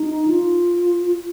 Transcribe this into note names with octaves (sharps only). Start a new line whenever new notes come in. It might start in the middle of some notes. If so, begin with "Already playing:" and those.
Already playing: D#4
F4